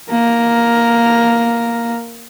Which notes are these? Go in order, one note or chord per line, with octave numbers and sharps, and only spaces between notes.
A#3 A#4